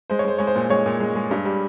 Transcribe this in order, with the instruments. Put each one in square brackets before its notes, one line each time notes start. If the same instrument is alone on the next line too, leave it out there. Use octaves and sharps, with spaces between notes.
[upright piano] G#3 C5
C#5
G#3 C5
G#3 C#5
C5
A#2
G#3 C#5
A#2
G#3
G#3
G2
G3